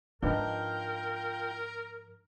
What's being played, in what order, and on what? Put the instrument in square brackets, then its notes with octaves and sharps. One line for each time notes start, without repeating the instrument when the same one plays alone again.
[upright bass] G#2 F3 [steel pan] D4 D#4 B4 [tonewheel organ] F4 G5 [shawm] A#4